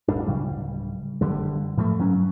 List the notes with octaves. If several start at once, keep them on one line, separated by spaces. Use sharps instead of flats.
D#1 G#1 G2 D4
D1 C#3 G3
F#1 B1 D3 G3
A2 F3 G3 A3
G2 F#3 C#4